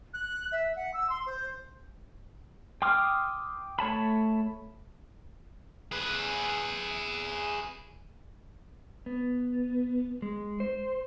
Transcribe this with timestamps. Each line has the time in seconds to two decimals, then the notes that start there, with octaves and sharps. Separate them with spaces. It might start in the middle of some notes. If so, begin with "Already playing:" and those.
0.14 F#6
0.52 E5
0.76 F#5
0.94 E6
1.09 C6
1.26 C5
2.82 G5 C6 D6 D#6 F6
3.79 A3 C#5 A5 B5
5.92 G#4 B4
9.06 B3
10.22 G#3
10.60 C5